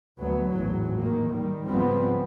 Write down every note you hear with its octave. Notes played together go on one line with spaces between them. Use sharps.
D2 F#3 B3
G#1 E2 A2 F#3
D#3 A#3
D#3 G3
C#2 G#2 F3 G3 B3 C4